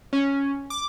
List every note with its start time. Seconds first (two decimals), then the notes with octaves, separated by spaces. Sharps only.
0.13 C#4
0.70 D6